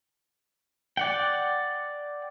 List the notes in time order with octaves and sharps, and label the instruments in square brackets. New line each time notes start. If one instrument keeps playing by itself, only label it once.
[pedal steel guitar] D5 F#5 G5